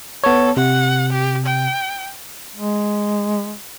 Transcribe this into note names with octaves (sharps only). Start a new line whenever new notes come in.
B3 A4 C#5
C3 F#5
G4
G5
G#3